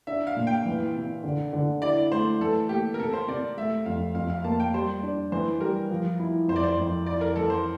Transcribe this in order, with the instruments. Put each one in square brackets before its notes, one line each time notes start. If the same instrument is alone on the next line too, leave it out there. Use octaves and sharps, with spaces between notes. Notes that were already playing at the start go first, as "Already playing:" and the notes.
[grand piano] D4 [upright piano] E5
[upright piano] F5
[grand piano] A#2
[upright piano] G5
[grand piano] E3
C3
D3
D3
[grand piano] E4 [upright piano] D5
[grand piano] A3 [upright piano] C5
[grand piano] E3 [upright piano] A4
[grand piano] A#3 [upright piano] G4
[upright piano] A#4
[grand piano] C3 [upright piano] A4
[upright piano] C5
[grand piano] C3 [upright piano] D5
[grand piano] A3 [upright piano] E5
[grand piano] F2 [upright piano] F5
[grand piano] F2 [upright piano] F5
[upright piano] F5
[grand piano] A#3 [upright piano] A5
[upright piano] G5
[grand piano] G3 [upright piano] C5
[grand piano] D4
[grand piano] E3 [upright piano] C5
[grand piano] G3 [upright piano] A#4
[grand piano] F3
E4
[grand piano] F2 [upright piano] C5
[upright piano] D5
C5
[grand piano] F2
[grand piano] E4 [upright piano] D5
[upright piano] A#4
[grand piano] E3 [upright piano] A4
[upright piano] C5